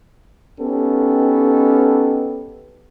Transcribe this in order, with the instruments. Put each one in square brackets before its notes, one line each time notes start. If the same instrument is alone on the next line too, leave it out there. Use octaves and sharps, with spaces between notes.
[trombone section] B3 C#4 D#4 G4 A4